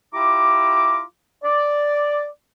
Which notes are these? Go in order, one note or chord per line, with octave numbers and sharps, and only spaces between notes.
E4 F4 G4 A#5 D6
D5